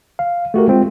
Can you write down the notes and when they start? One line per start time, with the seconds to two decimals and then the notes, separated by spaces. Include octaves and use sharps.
0.19 F5
0.54 A3 F#4 G4 A#4
0.68 G#3 C4 F4